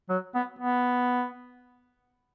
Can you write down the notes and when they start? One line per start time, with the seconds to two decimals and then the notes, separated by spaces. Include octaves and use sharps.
0.10 F#3
0.35 B3
0.59 B3